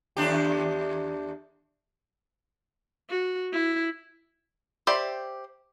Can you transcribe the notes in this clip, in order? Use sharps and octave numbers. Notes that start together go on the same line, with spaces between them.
D#2 D4 G4
F#4
E4
G4 C5 D5 E5 G5